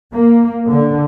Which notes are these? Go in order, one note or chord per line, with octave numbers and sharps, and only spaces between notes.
A#3
D3